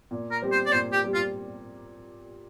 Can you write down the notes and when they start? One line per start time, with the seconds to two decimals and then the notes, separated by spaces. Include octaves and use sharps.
0.11 A#2
0.31 A#4
0.42 G3 C4 G4
0.52 C5
0.66 D5
0.72 A#2 C5
0.93 G4
1.04 G3 C4 G4
1.14 F4